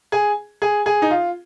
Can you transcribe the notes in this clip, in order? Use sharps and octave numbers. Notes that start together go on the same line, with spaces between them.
G#4
G#4
G#4
D#4
F4